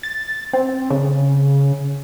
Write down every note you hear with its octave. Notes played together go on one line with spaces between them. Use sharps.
A6
C4
C#3